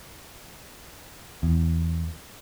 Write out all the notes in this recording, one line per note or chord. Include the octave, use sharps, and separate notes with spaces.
E2